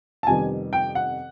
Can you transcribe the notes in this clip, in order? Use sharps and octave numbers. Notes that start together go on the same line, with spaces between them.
A5
F2 C3 D#3 G3 B3 G#5
G5
F#5